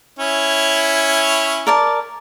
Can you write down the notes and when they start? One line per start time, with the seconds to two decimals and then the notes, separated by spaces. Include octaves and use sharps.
0.19 C#4 E4 C#5
1.67 A#4 D5 A5